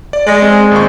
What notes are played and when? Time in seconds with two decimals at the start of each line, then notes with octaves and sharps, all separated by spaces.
0.13 D5
0.27 G#3 D5 A#6
0.42 C4 G#4
0.71 G#1 A#2 C#6